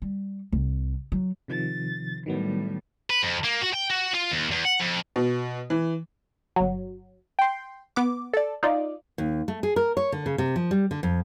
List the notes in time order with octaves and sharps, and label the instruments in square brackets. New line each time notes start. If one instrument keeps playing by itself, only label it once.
[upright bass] G3
C2
F#3
[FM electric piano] C3 D#3 F3 [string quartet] A6
[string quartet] A2 G3 [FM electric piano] D#3 F#3 B3
[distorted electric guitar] B4
F2
A#3
F#4
G5
F#4
F4
D#2
E2
F#5
F2
[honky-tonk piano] B2
E3
[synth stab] G1 F#3
G5 C6
B3 D6
A4 D5
D#4 F4 D5
[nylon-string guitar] D#2
A3
G#4
A#4
C#5
D3
C#3
C3
F3
G3
D3
F2